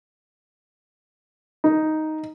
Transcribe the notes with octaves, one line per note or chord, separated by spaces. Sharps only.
D#4